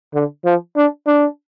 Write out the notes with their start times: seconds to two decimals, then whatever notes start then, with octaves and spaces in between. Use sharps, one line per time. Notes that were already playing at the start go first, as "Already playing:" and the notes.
0.14 D3
0.45 F3
0.77 D4
1.07 D4